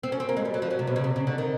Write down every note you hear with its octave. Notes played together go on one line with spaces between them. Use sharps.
C4
C#4
C4
A#3
G#3
G3
F#3
F3
F#3
C3
B2
C#3
C3
C#3
D3
D#3